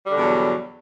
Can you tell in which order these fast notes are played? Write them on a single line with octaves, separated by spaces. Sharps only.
G3 D3 B2 E2 F#3